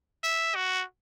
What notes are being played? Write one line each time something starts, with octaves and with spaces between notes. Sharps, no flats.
E5
F#4